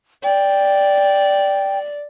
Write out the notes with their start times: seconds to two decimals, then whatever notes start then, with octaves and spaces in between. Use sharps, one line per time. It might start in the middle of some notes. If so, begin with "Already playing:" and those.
0.24 D5 G5